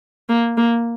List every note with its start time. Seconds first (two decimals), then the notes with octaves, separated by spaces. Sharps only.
0.29 A#3
0.57 A#3